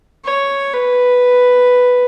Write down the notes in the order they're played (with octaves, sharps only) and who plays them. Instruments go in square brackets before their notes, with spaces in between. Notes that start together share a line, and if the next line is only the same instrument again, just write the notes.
[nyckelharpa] C#5
B4